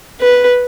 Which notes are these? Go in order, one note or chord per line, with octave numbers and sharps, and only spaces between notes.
B4